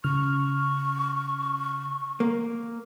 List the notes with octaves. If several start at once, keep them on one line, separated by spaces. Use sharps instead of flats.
C#3 C#6 F6
A#3